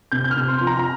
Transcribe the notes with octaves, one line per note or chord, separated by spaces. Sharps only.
C3 G6
G6
F6
C3
C6
F3
A#5
A#5